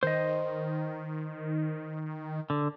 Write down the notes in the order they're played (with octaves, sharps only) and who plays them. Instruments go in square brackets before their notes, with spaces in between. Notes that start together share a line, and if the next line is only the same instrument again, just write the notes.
[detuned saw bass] D#3 [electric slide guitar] C5 D#5
[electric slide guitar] D3